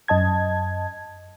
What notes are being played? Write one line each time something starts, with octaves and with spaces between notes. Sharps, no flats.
F#2 D#5 A5 G#6